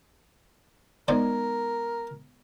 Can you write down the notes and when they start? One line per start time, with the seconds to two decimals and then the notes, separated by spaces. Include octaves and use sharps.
1.08 G#3 B3 D#4 A#4 C5 D5 G#5